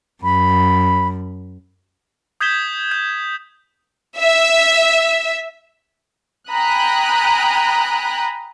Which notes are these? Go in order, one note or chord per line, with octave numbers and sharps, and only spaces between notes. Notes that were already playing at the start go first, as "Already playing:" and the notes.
F#2 B5
D#6 G6 G#6 B6 E7 G7
G6
E5
G5 G#5 A#5 B5 D#6 F#6